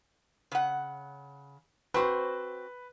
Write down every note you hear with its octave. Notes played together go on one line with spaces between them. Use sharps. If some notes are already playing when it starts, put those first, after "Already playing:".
C#3 F#5
C4 F#4 B4 C5